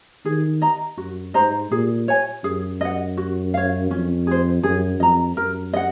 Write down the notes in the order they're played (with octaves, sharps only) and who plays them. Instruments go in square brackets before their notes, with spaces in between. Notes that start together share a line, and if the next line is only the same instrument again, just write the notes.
[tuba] D#3 [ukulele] G#4
[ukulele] D#5 A#5
[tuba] F#2 [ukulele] F#4
[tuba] G#2 [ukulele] C5 D#5 A#5
[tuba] A#2 [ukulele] G#4
[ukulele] C#5 G#5
[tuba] F#2 [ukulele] G#4
[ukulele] D#5 F#5
F#4
C#5 F5
[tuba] F2 [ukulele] C#4
[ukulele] G#4 C5
[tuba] F#2 [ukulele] G#4
[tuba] F2 [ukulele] D#5 A#5
[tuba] F#2 [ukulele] A#4
[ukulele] D#5 F#5